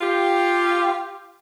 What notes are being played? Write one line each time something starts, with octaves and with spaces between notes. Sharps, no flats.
F4 G4